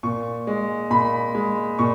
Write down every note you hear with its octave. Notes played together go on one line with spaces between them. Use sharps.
A#2 C#6
G#3
A#2 B5
G#3
A#2 C#6